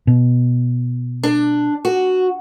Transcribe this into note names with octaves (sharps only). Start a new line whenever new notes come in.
B2
D4
F#4